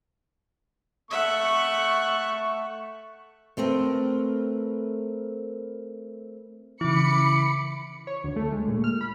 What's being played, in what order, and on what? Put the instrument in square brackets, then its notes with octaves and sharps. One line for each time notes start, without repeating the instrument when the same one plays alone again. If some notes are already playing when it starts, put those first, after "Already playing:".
[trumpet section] A3 C#6 [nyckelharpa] E5 F#5
[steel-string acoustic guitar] A3 C4 A#4 B4
[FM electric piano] C#3 E3 [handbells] E4 [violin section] B5 C#7 [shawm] D6
[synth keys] C#5
D2
A3
G#3
A#2
F6
B5